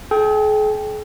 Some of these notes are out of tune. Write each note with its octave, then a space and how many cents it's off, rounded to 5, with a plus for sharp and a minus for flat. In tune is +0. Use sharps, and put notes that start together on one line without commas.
G#4 +45 G5 +0